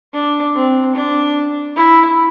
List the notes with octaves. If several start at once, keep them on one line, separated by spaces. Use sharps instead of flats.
D4
C4
D4
E4